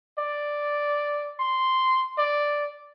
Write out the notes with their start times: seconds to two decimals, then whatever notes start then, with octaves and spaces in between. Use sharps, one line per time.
0.19 D5
1.40 C6
2.18 D5